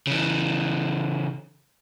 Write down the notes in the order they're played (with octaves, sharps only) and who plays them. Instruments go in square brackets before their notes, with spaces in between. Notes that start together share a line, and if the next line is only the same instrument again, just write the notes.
[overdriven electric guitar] C#3 E3